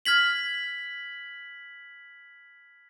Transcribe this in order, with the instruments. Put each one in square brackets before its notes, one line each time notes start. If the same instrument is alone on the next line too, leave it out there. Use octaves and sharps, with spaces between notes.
[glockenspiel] F6 G#6 B6 F#7